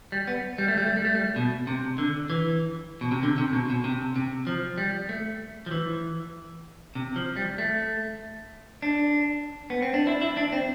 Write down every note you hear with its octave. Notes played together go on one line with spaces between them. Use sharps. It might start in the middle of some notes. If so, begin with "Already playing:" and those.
G3
B3
G3
A3
G3
A3
G3
A3
G3
B2
C3
D3
E3
B2
C3
D3
C3
B2
B2
C3
C3
F3
G3
A3
F3
E3
C3
F3
G3
A3
D4
B3
C4
D4
E4
E4
D4
C4